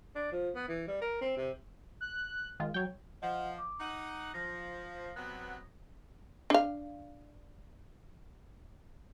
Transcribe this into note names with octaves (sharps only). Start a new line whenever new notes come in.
D4
F3
B3
E3
G3
A#4
C4
C3
F#6
D#3 G#3 F4
F#3 C#5 G5
F3 D#5 F#5
D6
D#4 F#5
F3 A#6
C3 F#3 B3
D4 F5